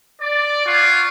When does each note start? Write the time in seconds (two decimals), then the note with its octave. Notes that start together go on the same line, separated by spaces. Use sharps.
0.21 D5
0.66 F4 F5 F#5 G#5 C#6